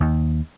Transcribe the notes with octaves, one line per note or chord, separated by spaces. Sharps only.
D#2